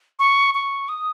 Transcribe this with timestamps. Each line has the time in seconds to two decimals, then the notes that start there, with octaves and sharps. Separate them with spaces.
0.19 C#6
0.54 C#6
0.89 D#6